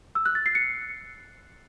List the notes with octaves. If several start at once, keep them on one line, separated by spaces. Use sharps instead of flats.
E6
F#6
A6
C7
C#7